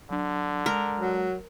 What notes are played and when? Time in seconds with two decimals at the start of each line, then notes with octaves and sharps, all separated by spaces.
0.10 D3 F#3 D4
0.66 G#3 A#4
0.98 F#3